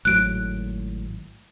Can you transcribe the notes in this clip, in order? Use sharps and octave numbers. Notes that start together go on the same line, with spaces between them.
G#1 A2 F#3 F#6 D7